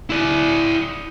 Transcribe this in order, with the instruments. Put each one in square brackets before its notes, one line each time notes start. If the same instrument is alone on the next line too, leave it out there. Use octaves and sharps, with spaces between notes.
[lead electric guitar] E4 D5